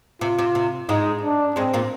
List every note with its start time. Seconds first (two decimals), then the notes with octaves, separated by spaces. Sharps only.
0.21 C3 F4
0.39 C3
0.55 C3
0.89 G#2 G#3 D#4
1.23 D4
1.56 G#2 G#3 C4
1.73 A#2 A#3